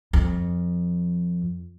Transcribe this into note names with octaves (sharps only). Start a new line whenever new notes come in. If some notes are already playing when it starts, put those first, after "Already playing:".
F2